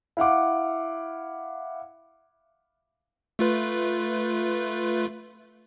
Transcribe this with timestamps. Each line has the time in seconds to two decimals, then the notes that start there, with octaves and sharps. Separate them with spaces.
0.17 E4 F5 F#5 D6
3.39 A3 F4 B4